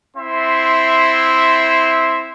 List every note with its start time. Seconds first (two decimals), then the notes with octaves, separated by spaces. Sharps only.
0.17 C4 E4 E5 C6